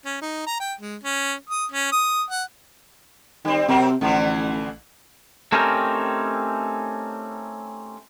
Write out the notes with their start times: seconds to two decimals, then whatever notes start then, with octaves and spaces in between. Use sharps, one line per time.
0.05 C#4
0.22 D#4
0.47 A#5
0.60 G5
0.81 G#3
1.04 C#4
1.49 D#6
1.72 C#4
1.92 D#6
2.30 F#5
3.45 D#3 G3 C4
3.68 C3 F#3 C4 A#4
4.01 A1 D3 E3 F3
5.52 A3 C4 C#4 D#4 G4 A#4